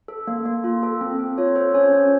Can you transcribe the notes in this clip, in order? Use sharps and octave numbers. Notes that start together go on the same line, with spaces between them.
A4
A#3
A#3
F4
A4
C4
C4
F4 C#5
A4 C5
C#4 C#5
C#4 C5